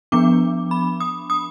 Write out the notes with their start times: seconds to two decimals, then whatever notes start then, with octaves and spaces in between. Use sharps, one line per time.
0.12 F3 B3 D4 D6
0.71 B5
1.00 D#6
1.30 D#6